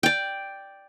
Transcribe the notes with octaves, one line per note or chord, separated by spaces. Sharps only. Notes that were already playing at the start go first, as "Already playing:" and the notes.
D5 G5